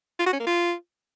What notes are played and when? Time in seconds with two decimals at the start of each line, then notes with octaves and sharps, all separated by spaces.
0.19 F4
0.26 F#4
0.33 C#4
0.40 A#3
0.47 F4